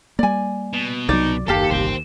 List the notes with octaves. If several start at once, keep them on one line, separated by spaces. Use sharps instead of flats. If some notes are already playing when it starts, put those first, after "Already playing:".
G3 A#3 D5 G#5
B2
C2 F#3 D#4 D5
F#1 D#2 G4 A4 F5 A5
G1 C2 C5 G5